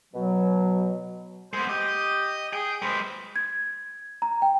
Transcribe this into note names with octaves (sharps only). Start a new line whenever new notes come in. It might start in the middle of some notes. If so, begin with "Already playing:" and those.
B2 F#3
G#3 B3 C5
G4 D#5
G#4 G5
G#3 B4 C5
G#6
A#5
G5